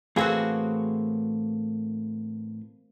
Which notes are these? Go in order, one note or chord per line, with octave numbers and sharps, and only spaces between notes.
A2 E3 A#3 C4 F#4 G#4